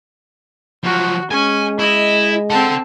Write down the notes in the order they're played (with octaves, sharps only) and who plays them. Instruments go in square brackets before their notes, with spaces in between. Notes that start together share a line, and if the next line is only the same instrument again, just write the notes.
[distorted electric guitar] F3 F#3 [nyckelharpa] F#4
[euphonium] G#3 [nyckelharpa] C#4 [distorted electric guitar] G#5
[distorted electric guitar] E4 [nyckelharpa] D#5
[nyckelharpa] C4 A5 [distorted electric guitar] A4 F#5